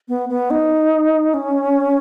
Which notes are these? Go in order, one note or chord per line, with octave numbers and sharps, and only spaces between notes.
B3
B3
D#4
C#4